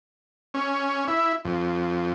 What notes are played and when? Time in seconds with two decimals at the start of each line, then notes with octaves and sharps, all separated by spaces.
0.54 C#4
1.08 E4
1.45 F2